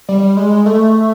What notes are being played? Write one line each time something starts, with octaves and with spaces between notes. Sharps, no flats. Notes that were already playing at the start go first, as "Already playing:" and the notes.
G3
G#3
A3